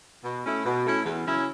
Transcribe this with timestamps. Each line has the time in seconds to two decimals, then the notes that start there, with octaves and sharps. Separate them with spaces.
0.24 B2
0.44 A3 C#4 E4
0.65 B2
0.85 A3 C#4 E4
1.05 E2
1.26 C#3 F#3 C#4 E4